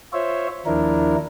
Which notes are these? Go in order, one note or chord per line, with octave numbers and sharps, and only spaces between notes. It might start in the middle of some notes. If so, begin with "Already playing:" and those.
F4 C5 C#5 E5
D#2 F3 D4 E4 A#4